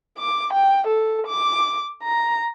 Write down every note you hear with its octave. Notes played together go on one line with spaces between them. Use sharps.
D6
G5
A4
D6
A#5